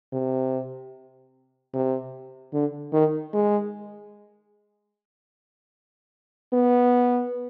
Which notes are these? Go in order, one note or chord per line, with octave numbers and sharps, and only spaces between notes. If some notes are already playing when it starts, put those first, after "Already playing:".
C3
C3
D3
D#3
G#3
B3